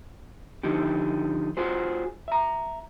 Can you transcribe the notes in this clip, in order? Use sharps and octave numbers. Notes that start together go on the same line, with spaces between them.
D3 F3 D#4 E4 G4
F4 F#4 G#4 C5
E5 A#5